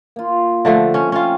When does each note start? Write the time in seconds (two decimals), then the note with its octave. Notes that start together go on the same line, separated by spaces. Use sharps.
0.16 A#3 F4
0.65 D3 F3 A3
0.94 C#4
1.12 C4 C#4 F4